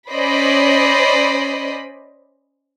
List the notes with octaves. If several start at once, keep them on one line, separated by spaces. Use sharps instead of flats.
C#4 C5 D5 D#5 B5